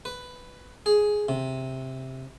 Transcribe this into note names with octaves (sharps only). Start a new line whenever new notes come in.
B4
G#4
C3